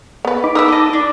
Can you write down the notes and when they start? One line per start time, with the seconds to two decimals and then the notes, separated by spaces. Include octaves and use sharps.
0.25 B3 B4
0.44 D#4 B5 D6
0.55 A#4 B4 D#6 E6
0.68 A4 D#5
0.93 D4